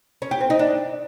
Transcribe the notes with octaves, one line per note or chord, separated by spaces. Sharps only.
C#4
G4
C4
D#4
D4